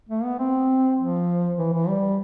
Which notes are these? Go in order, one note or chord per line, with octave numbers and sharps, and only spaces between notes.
A3
B3
C4
F3
E3
E3
G3